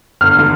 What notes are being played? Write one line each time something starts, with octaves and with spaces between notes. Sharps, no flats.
G1 F6
D3